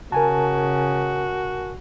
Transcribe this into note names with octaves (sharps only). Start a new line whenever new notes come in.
C#3 F#4 A#4 G#5 A5